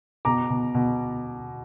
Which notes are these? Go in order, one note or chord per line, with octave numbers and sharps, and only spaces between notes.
B2 A#5 D6
B2
B2